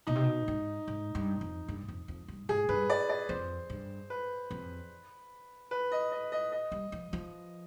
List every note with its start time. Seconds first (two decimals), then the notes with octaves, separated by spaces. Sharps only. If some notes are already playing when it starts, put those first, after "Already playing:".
0.07 B2 D#4
0.15 C3
0.24 B2
0.48 G#2
0.88 G#2
1.15 G2
1.41 F2
1.68 G2
1.88 F2
2.08 F2
2.28 G2
2.49 G#2 G#4
2.69 G2 B4
2.90 D5
3.09 D5
3.29 F2 C5
3.70 G2
4.10 B4
4.51 F2
5.71 B4
5.92 D#5
6.12 D#5
6.32 D#5
6.52 D#5
6.72 G3
6.92 F3
7.13 F3